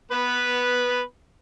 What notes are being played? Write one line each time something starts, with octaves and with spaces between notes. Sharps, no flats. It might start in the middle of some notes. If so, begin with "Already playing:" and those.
B3 B4